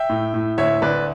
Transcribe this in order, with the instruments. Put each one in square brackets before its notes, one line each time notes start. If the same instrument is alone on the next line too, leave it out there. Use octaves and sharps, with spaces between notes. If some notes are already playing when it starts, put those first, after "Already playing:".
Already playing: [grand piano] E5 G5
A2
A2
D2 C#5 E5
D2 B4 D5